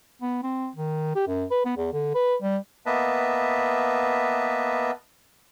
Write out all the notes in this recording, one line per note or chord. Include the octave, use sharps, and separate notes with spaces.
B3
C4
D#3
G4
F#2
B4
B3
E2
D3
B4
G3
A#3 B3 B4 D#5 E5 A5